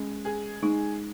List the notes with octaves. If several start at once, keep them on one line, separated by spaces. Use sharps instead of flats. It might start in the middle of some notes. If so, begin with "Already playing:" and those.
Already playing: G#3 C#4
G#4
G#3 D#4